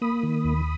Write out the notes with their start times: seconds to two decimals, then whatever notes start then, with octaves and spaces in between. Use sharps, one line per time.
0.01 A#3 B5 D#6
0.23 D#3
0.44 D#2